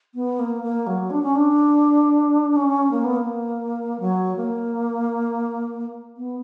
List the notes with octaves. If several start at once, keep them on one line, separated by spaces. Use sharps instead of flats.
B3
A#3
A#3
F#3
D4
C#4
D4
C#4
A#3
B3
A#3
F#3
A#3
B3